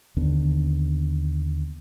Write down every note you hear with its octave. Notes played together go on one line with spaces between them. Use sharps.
D#2 D3 B3